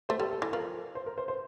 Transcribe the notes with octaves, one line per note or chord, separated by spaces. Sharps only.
A3 C5
G3 A4
A4
E3 A4
F3 A#4
C5
A#4
C5
C5